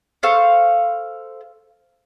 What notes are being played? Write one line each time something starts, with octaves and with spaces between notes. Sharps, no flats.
A4 C5 F5 C#6